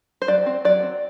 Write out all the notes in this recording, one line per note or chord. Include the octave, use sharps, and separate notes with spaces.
C5
F#3 D5
C4
F#3 D5
C4